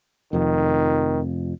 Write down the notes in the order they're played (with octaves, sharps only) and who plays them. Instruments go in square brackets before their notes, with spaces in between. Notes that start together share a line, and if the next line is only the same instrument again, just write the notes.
[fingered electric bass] F1 F2 [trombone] D#3